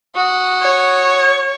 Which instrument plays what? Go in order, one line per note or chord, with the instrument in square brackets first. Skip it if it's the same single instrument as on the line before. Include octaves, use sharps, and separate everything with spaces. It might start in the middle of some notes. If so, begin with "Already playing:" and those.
[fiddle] F#4 D#6
[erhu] C#5